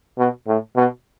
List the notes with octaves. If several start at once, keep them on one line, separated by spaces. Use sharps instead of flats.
B2
A2
B2